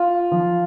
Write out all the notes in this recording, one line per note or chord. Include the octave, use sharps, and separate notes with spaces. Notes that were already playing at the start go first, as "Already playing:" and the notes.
Already playing: F4
F3